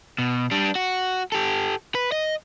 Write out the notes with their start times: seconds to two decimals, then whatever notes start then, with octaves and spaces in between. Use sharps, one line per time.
0.19 B2
0.51 G3 D4
0.75 F#4
1.32 G4 A4
1.95 B4
2.12 D#5